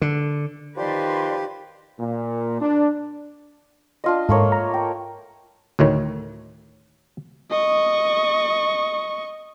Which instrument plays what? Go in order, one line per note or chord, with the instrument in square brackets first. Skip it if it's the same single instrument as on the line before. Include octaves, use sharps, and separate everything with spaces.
[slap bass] D3
[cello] D#3 B4 [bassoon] F3 [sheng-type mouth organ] G4 [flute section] D5 C6
[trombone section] A#2
D4
[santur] D4 F4 D#5
[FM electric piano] G#2 [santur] A3 A#3 C#5
[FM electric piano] A#5
[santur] G5
[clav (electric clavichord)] D2 A2 D#3 C#5
[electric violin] D#5 C#6